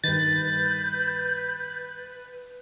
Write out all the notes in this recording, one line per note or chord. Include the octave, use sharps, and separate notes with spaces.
G2 D#3 B4 G6 A6